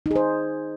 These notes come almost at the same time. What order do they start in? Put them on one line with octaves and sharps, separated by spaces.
D#4 G#4 C5